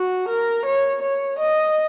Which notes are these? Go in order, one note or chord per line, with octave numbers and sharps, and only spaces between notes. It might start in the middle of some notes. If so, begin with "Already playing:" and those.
Already playing: F#4
A#4
C#5
C#5
D#5